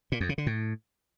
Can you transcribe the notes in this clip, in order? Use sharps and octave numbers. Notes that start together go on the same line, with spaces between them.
A#2
F2
C#3
D3
A2